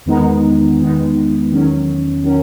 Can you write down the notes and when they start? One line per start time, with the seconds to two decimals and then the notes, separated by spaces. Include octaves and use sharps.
0.06 E2 D#3 G#3 B3 D#4
0.78 E2 D#3 G#3 B3 D#4
1.50 E2 D#3 F#3 C#4
2.23 D#3 F#3 C#4